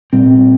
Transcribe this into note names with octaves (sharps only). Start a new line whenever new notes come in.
A#2 G3 C4